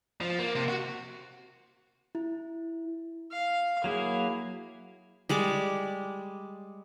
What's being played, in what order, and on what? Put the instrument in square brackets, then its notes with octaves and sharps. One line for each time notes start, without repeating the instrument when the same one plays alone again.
[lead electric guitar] F3
A#3
C3
F#4
[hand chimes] E4
[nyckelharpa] F5
[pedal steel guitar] F#3 A#3 E4 [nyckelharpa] G#4
[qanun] G3 G#3 D5 D6